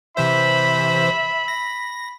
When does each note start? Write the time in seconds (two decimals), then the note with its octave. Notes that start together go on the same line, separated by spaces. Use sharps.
0.17 C3 E3 C5 E5 B5
1.48 A#6